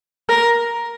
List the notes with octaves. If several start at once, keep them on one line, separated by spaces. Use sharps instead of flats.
A#4